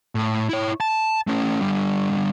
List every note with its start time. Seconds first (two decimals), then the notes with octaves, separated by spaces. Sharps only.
0.15 A2
0.49 E4 C#5
0.80 A5
1.27 A3 C#4
1.61 D3 G3